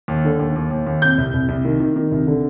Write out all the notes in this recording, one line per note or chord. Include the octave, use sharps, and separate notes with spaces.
D#2
D3
D#2
D#2
D#2
D#2
C3 G6
C2
C2
C2
D#3
D#3
D#3
C2
D3